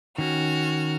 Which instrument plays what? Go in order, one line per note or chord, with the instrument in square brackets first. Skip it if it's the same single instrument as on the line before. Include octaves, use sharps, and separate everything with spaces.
[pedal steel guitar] D#3 C#4 [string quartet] F#4 F6